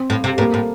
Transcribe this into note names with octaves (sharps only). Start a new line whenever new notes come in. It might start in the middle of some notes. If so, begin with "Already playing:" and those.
Already playing: C4
A2
C3
A2 A#3
A2